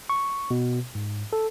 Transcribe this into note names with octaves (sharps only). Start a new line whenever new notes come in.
C#6
B2
G#2
A4